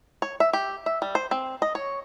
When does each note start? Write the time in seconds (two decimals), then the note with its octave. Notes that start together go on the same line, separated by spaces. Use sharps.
0.22 C#5
0.40 E5
0.53 G4
0.86 E5
1.02 G3
1.15 C5
1.31 C4
1.62 D#5
1.75 C#5